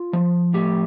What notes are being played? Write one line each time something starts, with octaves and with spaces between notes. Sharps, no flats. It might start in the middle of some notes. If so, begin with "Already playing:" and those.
Already playing: F4
F3
A2 G4